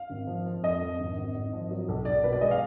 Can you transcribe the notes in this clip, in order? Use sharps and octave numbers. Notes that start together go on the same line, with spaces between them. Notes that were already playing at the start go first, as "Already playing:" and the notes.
Already playing: F5
G#1
F3
F3
F2 D#5
F2
G#1
G#1
G#1
F3
F#3
B1
B1 D5
B2 B4
D5
G#3 D#5
F5